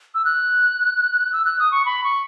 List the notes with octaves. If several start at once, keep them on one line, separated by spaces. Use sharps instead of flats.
E6
F#6
E6
F#6
D#6
C#6
B5
C#6